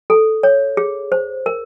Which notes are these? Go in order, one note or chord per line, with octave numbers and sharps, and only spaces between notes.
A4
C#5
G#4
C5
A#4